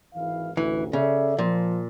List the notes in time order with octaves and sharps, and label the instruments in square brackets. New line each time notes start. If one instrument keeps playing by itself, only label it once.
[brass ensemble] G#1 E3 F5
[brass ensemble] A1 D2 [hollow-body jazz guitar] E3
[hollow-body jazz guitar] C#3 [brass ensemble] A4 D5 E5
[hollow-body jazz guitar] A#2 [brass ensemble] F3